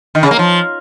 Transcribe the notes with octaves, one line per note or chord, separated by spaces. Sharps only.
D#3
C#3
A#3
F3